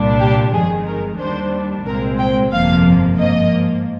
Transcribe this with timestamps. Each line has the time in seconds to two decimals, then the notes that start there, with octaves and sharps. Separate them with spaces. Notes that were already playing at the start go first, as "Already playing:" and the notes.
Already playing: C2 A#2 G3 D4
0.20 G4
0.53 G1 F2 D#3 G#3 G#4
0.86 A#4
1.19 D#2 D#3 G3 D4 C5
1.86 C2 A#2 G#3 C4 A#4
2.19 G5
2.52 G1 F2 C3 F3 A#3 F5
3.18 G#2 F3 A#3 D#5